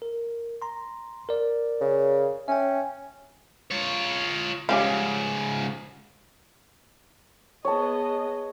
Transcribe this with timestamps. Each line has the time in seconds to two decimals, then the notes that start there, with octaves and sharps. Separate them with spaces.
0.02 A#4
0.62 A#5 C6
1.29 A#4 D5
1.81 C#3
2.48 C#4 E5 G5
3.71 F4 C#5
4.69 G#2 C#3 G3 C#4 F4
7.65 B3 G#4 C#5 D#5 A5